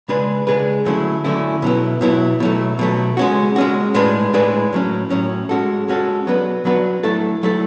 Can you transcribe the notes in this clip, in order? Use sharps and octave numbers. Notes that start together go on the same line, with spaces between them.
C#3 G#3 D4 G#4 B4
C#3 G#3 D4 G#4 B4
D3 F#3 A3 C#4 E4
D3 F#3 A3 C#4 E4
B2 F#3 B3 E4
B2 F#3 B3 E4
B2 F#3 A3
B2 F#3 A3
G#3 C#4 F#4
G#3 C#4 F#4
A2 G#3 D4 G#4 B4
A2 G#3 D4 G#4 B4
A2 F#3 C#4
A2 F#3 C#4
G#3 C#4 F#4 A4
G#3 C#4 F#4 A4
F#3 B3 D4 F#4 B4
F#3 B3 D4 F#4 B4
F#3 A3 E4 A4
F#3 A3 E4 A4